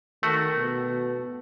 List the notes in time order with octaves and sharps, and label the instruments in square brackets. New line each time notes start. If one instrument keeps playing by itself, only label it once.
[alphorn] D#3 [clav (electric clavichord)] A3 F#4
[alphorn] B2